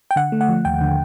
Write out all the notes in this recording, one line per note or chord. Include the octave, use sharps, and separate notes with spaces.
G5
D3 F#5
A3
F#5
F3
D#2 G5
D3